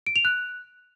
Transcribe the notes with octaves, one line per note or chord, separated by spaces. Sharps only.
D7
F7
F#6